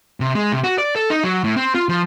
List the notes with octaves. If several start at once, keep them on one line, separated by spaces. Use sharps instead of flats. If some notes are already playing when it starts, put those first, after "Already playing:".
C3
G#3
C3
F#4
D5
A4
D#4
F#3
A2
C4
F4
F3